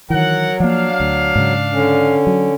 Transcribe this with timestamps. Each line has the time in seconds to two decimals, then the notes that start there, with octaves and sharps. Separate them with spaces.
0.10 D#3 E3 F#3 A#4 F#5
0.60 F3 A#3 D4 F5
1.00 D2
1.35 G#2 C#3
1.73 D3 C#4
2.27 F#3